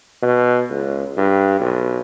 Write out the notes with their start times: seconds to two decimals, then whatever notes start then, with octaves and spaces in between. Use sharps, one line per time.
0.22 B2
0.70 C#2
1.17 G2
1.60 B1